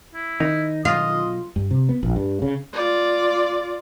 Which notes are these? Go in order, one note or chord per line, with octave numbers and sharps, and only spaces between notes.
E4
D#3 D#4
B1 F4 D#5
G2
C3
B3
A#1
G2
C#3
F4 D5